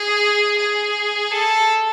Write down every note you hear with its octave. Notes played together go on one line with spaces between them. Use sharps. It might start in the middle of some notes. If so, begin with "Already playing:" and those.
Already playing: G#4
G#4
A4